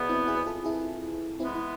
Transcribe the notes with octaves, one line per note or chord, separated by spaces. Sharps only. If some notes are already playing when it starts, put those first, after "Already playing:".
Already playing: E2 B2 B3
C4 E4
E4 G#4
B4
F4 A4
E4 G#4
E3 G#3 B3 C4 E4
E4